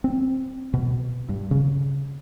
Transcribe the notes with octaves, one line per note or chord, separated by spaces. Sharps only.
C4
B2
G2
C#3